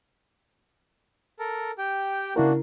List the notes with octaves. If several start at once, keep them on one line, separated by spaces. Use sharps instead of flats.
A4 A#4
G4 G5
C#3 A#3 D4 E4 F#4 A#4